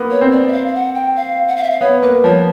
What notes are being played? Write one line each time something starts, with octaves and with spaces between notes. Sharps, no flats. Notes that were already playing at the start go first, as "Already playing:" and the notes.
Already playing: A#3 B3
C#5
C4
D5
E5
F5
F5
F#5
G5
F5
F#5
F5
E5
F5
B3 C#5
A#3 B4
F3 C#5